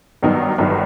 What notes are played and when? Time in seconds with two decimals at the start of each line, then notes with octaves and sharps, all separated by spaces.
0.23 G2 D#3 F#3 B3 D#4
0.58 G1 G2 D#3 F#3